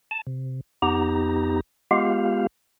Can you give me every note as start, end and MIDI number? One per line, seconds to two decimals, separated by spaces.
0.11 0.22 81
0.27 0.61 48
0.82 1.60 41
0.82 1.60 59
0.82 1.60 63
0.82 1.60 67
0.82 1.60 82
1.91 2.47 56
1.91 2.47 59
1.91 2.47 65
1.91 2.47 67
1.91 2.47 77